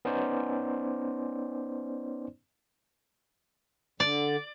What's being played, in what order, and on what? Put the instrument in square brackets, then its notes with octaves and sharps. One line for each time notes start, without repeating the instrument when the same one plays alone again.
[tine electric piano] B3 C#4 D#4 C5 D5
[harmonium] D3 [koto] D5